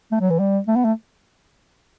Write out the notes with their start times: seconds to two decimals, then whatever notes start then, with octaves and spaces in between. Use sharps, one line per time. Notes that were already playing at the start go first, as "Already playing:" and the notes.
0.12 A3
0.21 F#3
0.30 E3
0.39 G3
0.68 A3
0.76 B3
0.85 A3